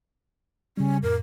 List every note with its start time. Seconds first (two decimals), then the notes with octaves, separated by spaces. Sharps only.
0.77 C#3 G3 C#4
1.03 F2 A2 A#4